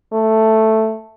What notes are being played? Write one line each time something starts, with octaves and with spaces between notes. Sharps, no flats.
A3